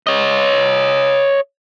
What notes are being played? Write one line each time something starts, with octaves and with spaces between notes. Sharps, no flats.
C#5 D#5